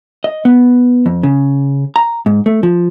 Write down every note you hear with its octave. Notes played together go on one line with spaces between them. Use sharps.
D#5
B3
F2
C#3
A#5
G#2
A3
F3